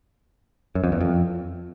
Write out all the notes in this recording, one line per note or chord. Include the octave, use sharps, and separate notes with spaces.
F#2
F2
E2
F2